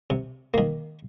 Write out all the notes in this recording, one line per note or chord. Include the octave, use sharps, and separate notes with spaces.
C3
D#3 A#3